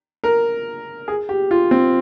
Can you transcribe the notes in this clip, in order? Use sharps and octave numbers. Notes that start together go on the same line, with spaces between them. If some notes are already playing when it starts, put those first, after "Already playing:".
A#4
G#4
G4
F4
C4